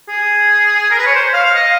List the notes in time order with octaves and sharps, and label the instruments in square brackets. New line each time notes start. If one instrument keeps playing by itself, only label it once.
[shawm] G#4
A#4
B4
C#5
C5
F5
F5
D#5